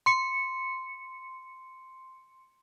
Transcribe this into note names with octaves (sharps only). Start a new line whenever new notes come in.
C6 C#7